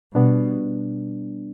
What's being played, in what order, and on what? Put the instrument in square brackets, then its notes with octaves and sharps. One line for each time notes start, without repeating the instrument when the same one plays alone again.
[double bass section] B2 [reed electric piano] G3 B3 D4